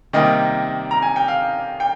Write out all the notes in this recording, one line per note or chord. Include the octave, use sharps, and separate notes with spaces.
C3 D#3 G3 A#3 D#5
A#5
G#5
G5
F5
G5